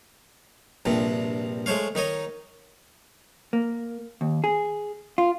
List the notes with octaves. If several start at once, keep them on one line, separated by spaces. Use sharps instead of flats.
A#1 G2 C3 F3
G#3 A3 C5 C#5 F5
D#3 D#4 C#5 D#5
A#3
D#2
G#4
F4